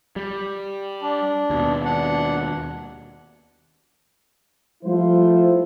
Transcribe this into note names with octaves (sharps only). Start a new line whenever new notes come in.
G3
D4
D#2 B2
D4 F#5
F3 G3 A3 E4 F4 C5